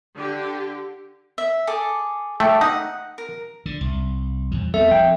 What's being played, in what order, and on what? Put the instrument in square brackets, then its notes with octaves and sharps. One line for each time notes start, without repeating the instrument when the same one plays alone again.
[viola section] D3 G4
[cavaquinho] E5
G#4 A4 D6
[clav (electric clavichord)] A3 [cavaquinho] G4
[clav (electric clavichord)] D#4 [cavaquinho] F#5
[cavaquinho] A#4
[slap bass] D3
C2
F2 E3
[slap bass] G3 B3 C4 [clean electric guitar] A4 [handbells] E5
[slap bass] F3 C4 [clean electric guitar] G5